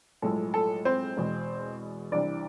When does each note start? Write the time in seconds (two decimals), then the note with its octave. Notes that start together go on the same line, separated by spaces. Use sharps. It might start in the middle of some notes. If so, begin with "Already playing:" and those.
0.22 B1 A2 F3 G#3 A4
0.54 A4
0.85 C4 C5
1.17 E2 B2 G#3
2.12 C2 C3 E3 D4 D5